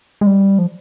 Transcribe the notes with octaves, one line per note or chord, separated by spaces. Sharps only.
G#3
G3
F3